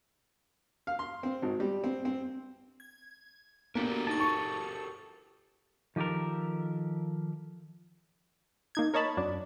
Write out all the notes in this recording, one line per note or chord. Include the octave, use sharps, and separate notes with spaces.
F5
C6
C4
G#1
G3
C4
C4
G#6
A#3 B3 D4 F#4 G4 A4 A#4
D#4 A5 C#6
C#6 C#7 F7
D#3 F3 G4 A4 A#4
A#3 D#4 G#6
A#4 C#5 D#5 A5 B5
F#2 F#3 D4